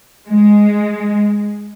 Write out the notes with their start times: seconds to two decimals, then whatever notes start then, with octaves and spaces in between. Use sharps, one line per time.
0.28 G#3